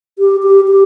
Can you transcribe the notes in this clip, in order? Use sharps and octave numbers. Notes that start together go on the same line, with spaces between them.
G4
G4
G4